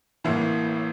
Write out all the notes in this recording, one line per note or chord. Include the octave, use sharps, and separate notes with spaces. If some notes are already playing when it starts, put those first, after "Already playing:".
A1 A2 E3 A#3 E4